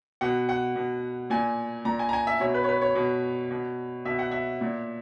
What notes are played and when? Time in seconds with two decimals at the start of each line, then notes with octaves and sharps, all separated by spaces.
0.21 B2 F#5
0.49 F#5
0.76 B2
1.30 A#2 G#5
1.85 A#2 A#5
1.99 G#5
2.09 A#5
2.13 G#5
2.27 E5
2.40 B2 C#5
2.54 B4
2.64 C#5
2.69 B4
2.81 C#5
2.95 B2
3.51 B2
4.05 B2 E5
4.19 F#5
4.31 E5
4.61 A#2